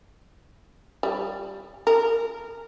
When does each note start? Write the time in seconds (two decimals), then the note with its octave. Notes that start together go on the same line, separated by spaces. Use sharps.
1.03 G3
1.87 A#4